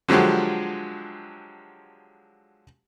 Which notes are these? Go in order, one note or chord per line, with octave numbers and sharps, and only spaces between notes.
D3 F3 F#3 G#3 G4